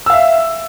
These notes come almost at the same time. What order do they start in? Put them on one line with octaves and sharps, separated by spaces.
E6 F5 E5